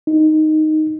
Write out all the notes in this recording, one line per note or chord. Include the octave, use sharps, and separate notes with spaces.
D#4